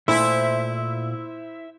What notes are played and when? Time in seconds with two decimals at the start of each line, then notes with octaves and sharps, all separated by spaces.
0.08 A#2 A3 E4 C5 E5